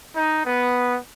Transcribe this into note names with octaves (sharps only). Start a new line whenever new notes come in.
D#4
B3